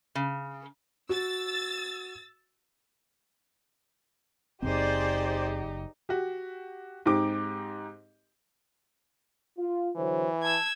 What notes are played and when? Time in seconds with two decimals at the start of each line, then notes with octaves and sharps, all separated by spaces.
0.15 C#3
1.09 F#4 E6 A6
4.63 F#1 F#2 C4 D#4 G4 G#4 C5 D5
6.09 F#4 G4
7.06 G#2 C4 D#4 G4 D6
9.57 F4
9.96 D3 E3 F#3 C5
10.43 A5 E6 G#6